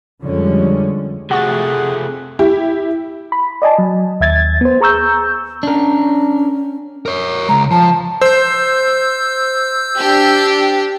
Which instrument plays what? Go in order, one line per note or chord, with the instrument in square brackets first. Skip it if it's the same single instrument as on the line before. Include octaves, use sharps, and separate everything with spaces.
[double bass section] F2 D3 F3 G3 G#3 C#4
[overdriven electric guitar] C3 A3 [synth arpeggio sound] F#4 C#6 A6 [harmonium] G#4 [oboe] F#5
[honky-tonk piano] E4 G4
[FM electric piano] B5
D5 D#5 G#5 A5
F#3
D#2 E5 G#6 A6
B3 C5
G#4 A#5 C#6 E6 G6
[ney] C#4 [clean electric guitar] D4 A#4
[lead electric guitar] A#4 C#5
[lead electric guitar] C#3 G#3 [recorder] A#5
[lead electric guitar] F3 [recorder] A5
[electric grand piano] C5 [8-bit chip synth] E6 G6
[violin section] D4 G4